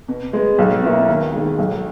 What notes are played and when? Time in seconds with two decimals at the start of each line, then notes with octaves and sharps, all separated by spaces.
0.08 B2
0.33 G#3 B3
0.58 B1
0.83 B2 A#3 E4 A#4
1.08 D#2
1.33 D#3 G#3
1.58 B1